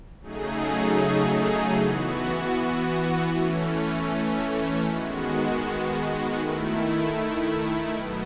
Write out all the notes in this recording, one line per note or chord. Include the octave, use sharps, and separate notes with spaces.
C#3 F#3 A3 D#4 G#4
E3 B3 F#4
E3 A3 C#4
D#3 G#3 B3 F#4
D#3 A3 E4
B2 F#3 B3